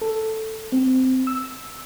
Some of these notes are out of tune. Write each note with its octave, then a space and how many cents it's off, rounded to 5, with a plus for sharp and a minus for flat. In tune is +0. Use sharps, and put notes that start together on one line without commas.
A4 +5
C4 -15
E6 -5